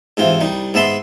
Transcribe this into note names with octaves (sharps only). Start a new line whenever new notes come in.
G#2 C3 E3 F4
C2 G3 D#4
G#2 B3 E5 A5 B5 C6